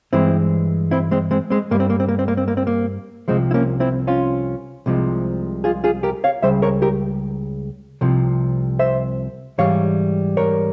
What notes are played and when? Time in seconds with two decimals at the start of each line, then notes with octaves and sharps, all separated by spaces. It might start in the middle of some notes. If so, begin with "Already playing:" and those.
0.13 G2 E3 G#3 C4 E4
0.91 C4 E4
1.11 G#3 C4
1.31 G#3 C4
1.50 G#3 C4
1.71 G2 G3 A#3
1.80 C4
1.90 A#3
2.00 C4
2.08 A#3
2.19 C4
2.28 A#3
2.37 C4
2.48 A#3
2.57 C4
2.67 A#3
3.28 C2 C3 F3 G#3 C4
3.51 E4
3.54 A#3 C#4
3.80 C4 E4
4.07 C#4 F4
4.86 C2 C3 F3 G#3
5.64 F4 G#4
5.84 F4 G#4
6.03 G4 A#4
6.24 C#5 F5
6.42 C#2 C#3 G3 C5 E5
6.62 A#4 C#5
6.82 G4 A#4
8.01 C2 C3 F3
8.79 C5 E5
9.58 G#2 E3 G3 C#5 F5
10.37 A#4 C#5